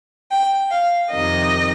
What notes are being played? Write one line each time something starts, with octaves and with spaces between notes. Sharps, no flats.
G5
F5
F2 C3 D#3 D#5